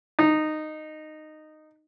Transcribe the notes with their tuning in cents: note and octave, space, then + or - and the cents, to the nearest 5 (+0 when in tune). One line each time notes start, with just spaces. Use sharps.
D#4 -15